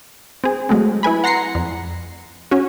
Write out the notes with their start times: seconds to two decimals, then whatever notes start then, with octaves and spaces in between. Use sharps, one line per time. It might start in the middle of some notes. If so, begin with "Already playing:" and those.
0.44 C4 G#4
0.69 F#3 G#3 A3 C4
1.03 E4 B4 G#5 B5
1.24 F#5 A#5 C6 A#6 C7 C#7
1.55 F2
2.51 C#4 F#4